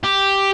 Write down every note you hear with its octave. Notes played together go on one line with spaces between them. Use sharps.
G4